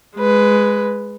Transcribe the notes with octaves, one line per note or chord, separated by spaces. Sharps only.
G#3 B4